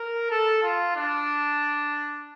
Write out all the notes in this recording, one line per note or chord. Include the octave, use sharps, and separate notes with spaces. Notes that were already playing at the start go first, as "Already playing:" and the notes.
Already playing: A#4
A4
F4
D4